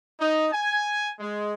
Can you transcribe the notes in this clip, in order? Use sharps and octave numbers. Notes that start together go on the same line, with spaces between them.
D#4
G#5
G#3